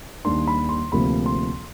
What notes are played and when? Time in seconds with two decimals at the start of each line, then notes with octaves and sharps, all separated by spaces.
0.24 D#2 D#3 G3 A#3 D4 C6
0.47 B5
0.69 C6
0.92 D2 C3 F3 A#3 B5
1.26 C6